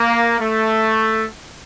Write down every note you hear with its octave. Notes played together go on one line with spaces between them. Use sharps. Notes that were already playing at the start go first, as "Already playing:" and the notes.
Already playing: A#3
A3